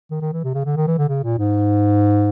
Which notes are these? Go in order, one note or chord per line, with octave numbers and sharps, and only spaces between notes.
D#3
D#3
E3
C3
C#3
D3
D#3
E3
D3
C#3
A#2
G#2